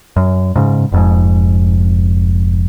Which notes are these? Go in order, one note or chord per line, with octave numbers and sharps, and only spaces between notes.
F#2
G#2 C#3
F1 F2 G#2